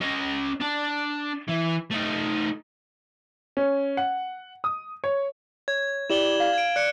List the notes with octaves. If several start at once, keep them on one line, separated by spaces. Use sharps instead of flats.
C#4 D#5
D4 A5
E3
A3 D#4
C#4
F#5
D#6
C#5
C#5 G#6
E4 G4 D5 E7 F#7 G7
F5
G#6 D7
D5 F#6 C#7